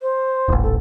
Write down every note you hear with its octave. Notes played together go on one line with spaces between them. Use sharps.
C5
D#1 A1
A4